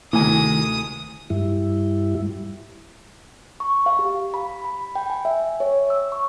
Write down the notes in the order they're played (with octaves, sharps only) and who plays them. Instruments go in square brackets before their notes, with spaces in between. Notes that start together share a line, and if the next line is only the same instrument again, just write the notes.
[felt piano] D2 G#5 [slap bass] C3 D#3 [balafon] E4 [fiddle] D#6
[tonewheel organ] G2 G3 E4
[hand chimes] C#6
F5
G4
B5
B5
G5
G#5
E5
C#5
E6
C#6